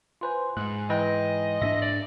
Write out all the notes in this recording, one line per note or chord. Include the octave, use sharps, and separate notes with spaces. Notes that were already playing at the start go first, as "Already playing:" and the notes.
F4 B4 C5 G#5 C6
G#2 F#6
E3 B4 D#5 G5
G#2 C#4 D4 E5 A#6
D5